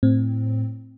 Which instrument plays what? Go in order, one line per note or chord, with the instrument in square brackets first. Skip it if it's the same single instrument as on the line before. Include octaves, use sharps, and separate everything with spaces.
[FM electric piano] A2 C4